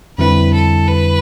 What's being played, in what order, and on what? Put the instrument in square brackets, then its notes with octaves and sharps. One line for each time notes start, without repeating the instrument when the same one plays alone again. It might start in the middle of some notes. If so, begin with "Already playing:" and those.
[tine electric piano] F2 D3 G3 C4 E4 [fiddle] B4
[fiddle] A4
B4